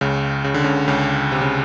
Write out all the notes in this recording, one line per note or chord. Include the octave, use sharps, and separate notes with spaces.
C#2 C#3
C#3
D3
C#2 C#3
C#2 C#3
C3
C#3